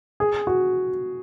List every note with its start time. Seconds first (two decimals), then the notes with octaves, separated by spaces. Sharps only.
0.20 G#4
0.47 F#4